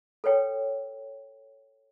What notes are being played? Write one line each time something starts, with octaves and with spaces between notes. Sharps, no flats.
A4 B4 C#5 G5